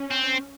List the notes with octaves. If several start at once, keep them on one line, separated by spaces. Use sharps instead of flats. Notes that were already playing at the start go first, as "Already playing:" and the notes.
Already playing: C#4
C4